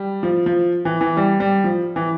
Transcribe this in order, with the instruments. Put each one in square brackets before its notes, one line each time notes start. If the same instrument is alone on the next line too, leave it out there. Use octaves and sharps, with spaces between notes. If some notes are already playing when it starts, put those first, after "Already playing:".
Already playing: [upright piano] G3
F3
F3
E3
E3
G3
G3
F3
E3